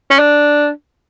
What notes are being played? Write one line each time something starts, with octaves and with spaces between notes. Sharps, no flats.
C#4
D4